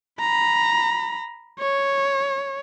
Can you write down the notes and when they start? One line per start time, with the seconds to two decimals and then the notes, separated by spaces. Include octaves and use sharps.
0.20 A#5 B5
1.59 C#5